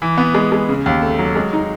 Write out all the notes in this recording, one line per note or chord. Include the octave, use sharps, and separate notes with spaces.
E3
B3
G#3
G#3
C#3
D#2
A3
F#3
G#3
D#4